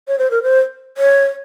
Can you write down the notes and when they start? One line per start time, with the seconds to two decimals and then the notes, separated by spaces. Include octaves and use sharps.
0.08 C#5
0.19 C5
0.31 A#4
0.43 C5
0.98 C#5